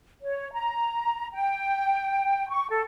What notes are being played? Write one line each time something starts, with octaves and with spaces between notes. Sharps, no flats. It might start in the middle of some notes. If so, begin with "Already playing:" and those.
C#5
A#5
G5
C#6
A4